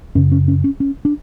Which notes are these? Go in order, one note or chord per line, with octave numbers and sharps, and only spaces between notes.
F#2 C#3 C#4
C#4
C#4
C#4
C#4
D4